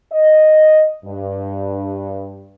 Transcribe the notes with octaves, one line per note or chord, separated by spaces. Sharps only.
D#5
G2